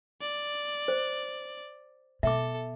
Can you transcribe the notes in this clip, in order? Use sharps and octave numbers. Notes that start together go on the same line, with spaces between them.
D5
C5
B2 A4 E5 D6